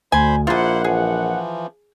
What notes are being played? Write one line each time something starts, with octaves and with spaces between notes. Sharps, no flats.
D2 C5 G#5 B5
A#1 A#3 E4 F4 G#4 C5 F#5
E3 F3 G#4